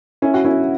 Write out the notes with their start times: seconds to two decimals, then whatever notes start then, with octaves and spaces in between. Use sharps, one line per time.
0.22 C#4 E4
0.34 F#4
0.45 C#4 E4